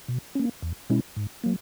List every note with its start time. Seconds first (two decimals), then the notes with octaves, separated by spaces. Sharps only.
0.08 B2
0.35 A#3 C#4
0.62 E2
0.90 B2 G#3 C#4 E4
1.16 G#2
1.44 F#3 A#3